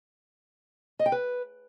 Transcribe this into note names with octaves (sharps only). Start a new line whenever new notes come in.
D#5
G5
B4